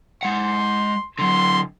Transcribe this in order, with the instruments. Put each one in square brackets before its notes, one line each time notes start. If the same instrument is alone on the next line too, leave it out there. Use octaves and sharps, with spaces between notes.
[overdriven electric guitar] G#3 F#5 [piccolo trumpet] C6
[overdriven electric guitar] D3 F#3 [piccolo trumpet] C6